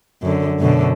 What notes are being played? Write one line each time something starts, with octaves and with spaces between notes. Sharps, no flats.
F#2 D3
F#2 B2 D3